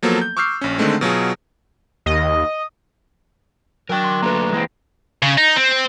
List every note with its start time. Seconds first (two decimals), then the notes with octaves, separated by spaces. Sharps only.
0.03 F3 F#3 A#3 B3 A4
0.21 G6
0.37 C#6 D6 E6 F6 G6 C7
0.61 A#1 C#4
0.78 D3 D#3 G#3 A3 C4
1.01 B2 F#3 F4 G#4
2.06 D#2 D#5
3.89 F#3 D4 A#4 G5
4.04 C6 D6
4.22 D3 A3 A#3 B4 A#5
4.53 E3 G#3 A#3 C4 E4
5.23 C#3
5.38 D#4
5.56 C4